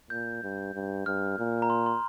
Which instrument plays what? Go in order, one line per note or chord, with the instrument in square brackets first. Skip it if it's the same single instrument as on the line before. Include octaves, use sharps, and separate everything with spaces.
[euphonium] A#2 [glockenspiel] G6
[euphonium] G2
G2
[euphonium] G2 [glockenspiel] F6
[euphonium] A#2
[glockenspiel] A#5
C6
C6